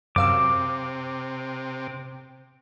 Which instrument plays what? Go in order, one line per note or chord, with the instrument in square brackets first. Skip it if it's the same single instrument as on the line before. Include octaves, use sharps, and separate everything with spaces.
[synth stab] F#2 F5 E6 [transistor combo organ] C3 [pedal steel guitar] D6